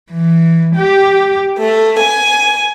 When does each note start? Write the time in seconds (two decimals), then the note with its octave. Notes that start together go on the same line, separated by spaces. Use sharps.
0.11 E3
0.76 G4
1.59 A3
1.99 G#5